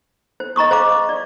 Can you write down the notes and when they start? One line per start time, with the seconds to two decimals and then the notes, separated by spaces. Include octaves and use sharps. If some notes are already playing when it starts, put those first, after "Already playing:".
0.40 C5
0.56 D#5 A#5 C#6 D#6
0.71 C5 F5 A#5 D6
1.09 D5